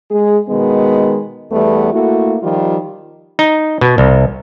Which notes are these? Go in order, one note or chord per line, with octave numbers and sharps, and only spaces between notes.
G#3 G#4
B2 D#3 G#3 B3
E2 G3 A3 B3
A3 A#3 E4 F#4
D#3 F3 G3 F4
D#4
B2
C2